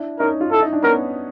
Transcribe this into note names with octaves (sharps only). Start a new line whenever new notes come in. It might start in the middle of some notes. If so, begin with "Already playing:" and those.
Already playing: D4 E4
C#4 D#4 A#4
F4
E4 A4
D#4
D4
B3 C#4 A#4